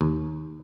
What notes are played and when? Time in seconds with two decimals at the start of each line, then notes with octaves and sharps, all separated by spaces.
0.01 D#2